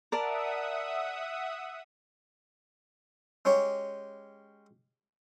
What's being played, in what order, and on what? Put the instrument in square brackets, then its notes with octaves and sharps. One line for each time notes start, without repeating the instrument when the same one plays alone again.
[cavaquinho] A#4 D5 A5 [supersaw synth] E5 F#5 D#6
[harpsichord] G#3 C#4 G4 C#5